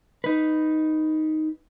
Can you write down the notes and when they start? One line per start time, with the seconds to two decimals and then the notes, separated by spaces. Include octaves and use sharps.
0.24 D#4 B4